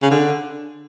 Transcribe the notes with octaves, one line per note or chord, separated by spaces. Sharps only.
C#3
D3